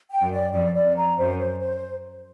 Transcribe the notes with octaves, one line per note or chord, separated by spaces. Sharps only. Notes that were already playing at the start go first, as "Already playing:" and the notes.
G5
F#2
D5
F2 D5
D5
F2
A#5
F#2 C5
C5
C5